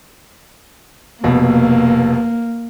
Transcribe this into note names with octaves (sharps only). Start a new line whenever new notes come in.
F1 B2 A#3